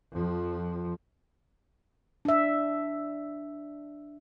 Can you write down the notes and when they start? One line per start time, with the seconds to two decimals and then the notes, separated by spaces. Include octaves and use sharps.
0.13 F2 F3
2.25 D4 E5